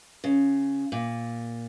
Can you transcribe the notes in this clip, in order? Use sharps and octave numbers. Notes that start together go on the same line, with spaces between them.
C#3
A#2